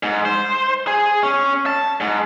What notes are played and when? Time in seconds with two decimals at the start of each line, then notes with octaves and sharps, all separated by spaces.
0.03 G#2
0.25 C5
0.87 G#4
1.23 C#4
1.66 A5
2.00 G#2